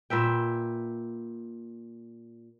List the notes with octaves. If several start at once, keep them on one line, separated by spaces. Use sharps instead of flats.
A#2 B4 E5 G5